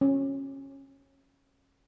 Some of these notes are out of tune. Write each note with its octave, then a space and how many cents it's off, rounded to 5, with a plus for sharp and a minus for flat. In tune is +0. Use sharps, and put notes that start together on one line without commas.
C#4 -20